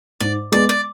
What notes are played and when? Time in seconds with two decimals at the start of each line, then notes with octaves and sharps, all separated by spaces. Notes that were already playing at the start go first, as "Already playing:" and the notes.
0.20 G#2 D5
0.52 G#3 B3 D5
0.69 D5